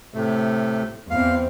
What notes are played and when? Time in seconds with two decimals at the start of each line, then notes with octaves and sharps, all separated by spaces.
0.14 A2 C3 A3
1.11 E2 C4 F5